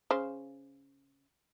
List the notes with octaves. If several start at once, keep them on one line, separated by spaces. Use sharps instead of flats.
C#3 C5